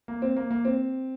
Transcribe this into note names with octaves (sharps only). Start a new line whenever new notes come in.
A#3
C4
A#3
A#3
C4